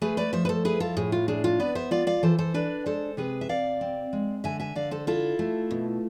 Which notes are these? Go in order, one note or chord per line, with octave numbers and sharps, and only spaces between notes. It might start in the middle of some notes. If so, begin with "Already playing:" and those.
A3 G#4 B4
B4 D5
F3 C5 E5
B4
A4 C5
E4 G#4 B4
F4 A4
A2 G#4
F4
D4 G#4
F4
B3 B4 D5
C5 E5
F4 D5 F5
D5 F5
E3 A4 C5
A4 C5
D4 B4 D5
G#3 A4 C5
C3 G#4 B4
E5
C3 D5 F5
C4
G#3
D3 E5 G#5
E5 G#5
D3 D5 F5
A4 C5
E4 F4 A4
A3
B2